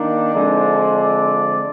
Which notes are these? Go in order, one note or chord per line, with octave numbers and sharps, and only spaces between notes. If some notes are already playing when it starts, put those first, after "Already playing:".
Already playing: D#3 A#3 D4
D3 F3 G#3 C4 D5
D5